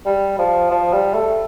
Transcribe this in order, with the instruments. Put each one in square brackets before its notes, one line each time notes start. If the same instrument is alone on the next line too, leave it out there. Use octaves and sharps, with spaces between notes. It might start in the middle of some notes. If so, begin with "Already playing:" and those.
[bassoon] G3
F3
F3
G3
A3